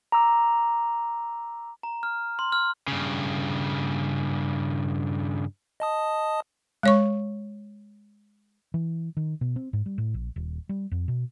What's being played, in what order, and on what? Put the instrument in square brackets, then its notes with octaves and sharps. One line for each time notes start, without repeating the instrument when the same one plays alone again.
[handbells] A#5 D6 E6
[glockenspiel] A#5
F6
C6
F6
[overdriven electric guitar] G2 C#3
[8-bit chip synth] D#5 A5 D#6
[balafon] G#3 C#5 C#6
[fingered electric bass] E3
D#3
B2
C4
G#2
G3
A2
A#1
D#1
G3
F2
B2